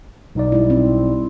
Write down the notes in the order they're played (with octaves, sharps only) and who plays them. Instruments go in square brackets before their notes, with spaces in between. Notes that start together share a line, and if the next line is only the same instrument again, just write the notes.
[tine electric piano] B1 D#4 D5
[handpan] G3 E4
C4